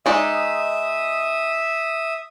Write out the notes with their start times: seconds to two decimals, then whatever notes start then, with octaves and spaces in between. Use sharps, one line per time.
0.06 G#3 D#4 D5 E5 D#6